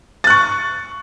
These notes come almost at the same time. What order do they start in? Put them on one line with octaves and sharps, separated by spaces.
A6 F#6 C#6